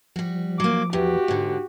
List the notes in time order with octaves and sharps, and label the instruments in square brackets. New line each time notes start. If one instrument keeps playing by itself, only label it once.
[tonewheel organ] F3 [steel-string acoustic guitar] G3 F#4
[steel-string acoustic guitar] F#3 A#3 [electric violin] D6
[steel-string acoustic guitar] E2 [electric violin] F#4 G4
[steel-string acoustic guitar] G#2 D3